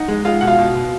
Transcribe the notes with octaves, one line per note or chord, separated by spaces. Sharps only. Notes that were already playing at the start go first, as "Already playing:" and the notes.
Already playing: D#4 F#5
G#3
G#3 F4 F5
B2 F#5
F4 F5
B2
B2